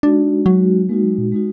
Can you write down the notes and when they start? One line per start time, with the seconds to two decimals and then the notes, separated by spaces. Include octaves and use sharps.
0.03 G#3 D4 D#4 F#4
0.46 F#3 G#3 D#4 F#4
0.89 G#3 A#3 D#4 F#4
1.04 F#3
1.18 A#2
1.32 G#3 D#4 F#4